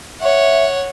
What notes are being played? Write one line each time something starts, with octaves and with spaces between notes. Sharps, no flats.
C#5 E5 F#5